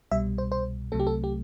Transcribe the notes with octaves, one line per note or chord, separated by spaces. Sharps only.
C2 B2 G3 E5
C5
C5
C2 C3 F#3 A3 A4
G4
A4
G4